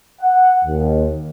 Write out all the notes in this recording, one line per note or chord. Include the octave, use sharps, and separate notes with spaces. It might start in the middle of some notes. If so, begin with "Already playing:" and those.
F#5
D#2